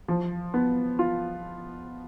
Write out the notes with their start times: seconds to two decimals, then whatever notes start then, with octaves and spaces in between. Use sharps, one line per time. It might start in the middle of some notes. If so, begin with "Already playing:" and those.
0.08 F3
0.54 B3
0.99 F4